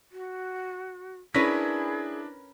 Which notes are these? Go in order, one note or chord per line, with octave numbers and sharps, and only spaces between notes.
F#4
C#4 D4 E4 G#4 A#4 B4 A#6 B6